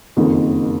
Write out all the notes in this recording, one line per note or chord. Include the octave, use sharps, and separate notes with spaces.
F#1 F2 D#3